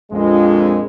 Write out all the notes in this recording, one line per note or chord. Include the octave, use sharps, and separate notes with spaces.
A#1 F2 G#3